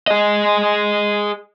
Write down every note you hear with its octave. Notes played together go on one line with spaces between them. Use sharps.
G#4 D#5